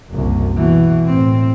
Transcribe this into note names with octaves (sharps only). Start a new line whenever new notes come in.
F#1 C2
B2 E3
A2 C4